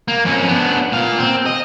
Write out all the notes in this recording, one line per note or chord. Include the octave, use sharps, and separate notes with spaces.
A#3
F2 C#4
B3 D4
A#2 F5
C4
D#5